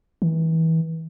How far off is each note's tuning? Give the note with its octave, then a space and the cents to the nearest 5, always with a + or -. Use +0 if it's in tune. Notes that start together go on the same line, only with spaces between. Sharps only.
E3 -30